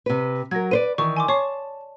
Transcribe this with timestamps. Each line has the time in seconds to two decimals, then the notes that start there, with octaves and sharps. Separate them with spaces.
0.06 C3 B4
0.51 F#3 A#4 G#6 A#6
0.71 B4 C5 D5 D#7
0.98 D#3 E3 C#6
1.17 G#5 C6 D6
1.28 C#5 A5 C#6 C7